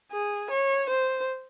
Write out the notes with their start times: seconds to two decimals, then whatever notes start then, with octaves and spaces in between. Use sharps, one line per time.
0.12 G#4
0.51 C#5
0.89 C5